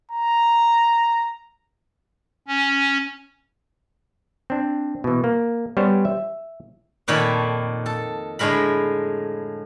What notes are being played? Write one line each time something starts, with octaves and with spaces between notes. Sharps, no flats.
A#5
C#4
C4 D4
B2 E3
A#3
G3 B3 C#4 C5 C#5
E5
F2 A#2 D#3 A4 C#5 B5
A4
A2 D3 G#3 A#4 B5